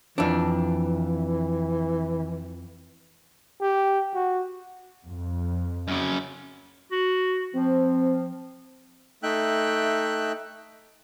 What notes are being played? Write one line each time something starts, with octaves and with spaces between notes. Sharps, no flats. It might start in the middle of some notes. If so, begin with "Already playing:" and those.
F2 E3 D4
G4
F#4
F2
F#2 C#3
F#4
F3 C4
A3 D#4 E5 G5 F#6